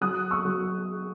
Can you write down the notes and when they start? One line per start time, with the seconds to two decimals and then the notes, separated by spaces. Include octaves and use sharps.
0.01 F#3 D#6 F#6
0.31 C#6 E6
0.45 F#3